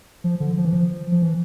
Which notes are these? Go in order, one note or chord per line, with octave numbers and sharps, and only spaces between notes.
F3
D3
F3
E3
F3
F3
E3